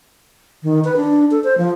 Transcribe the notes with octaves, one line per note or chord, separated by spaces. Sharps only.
D#3
B4
D4
A4
C5
F3